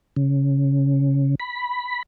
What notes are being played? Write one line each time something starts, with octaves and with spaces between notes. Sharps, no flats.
C#3
B5